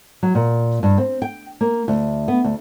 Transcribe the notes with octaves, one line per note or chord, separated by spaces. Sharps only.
F#3
A#2
G2
C4
G5
A#3
D2
B3
D2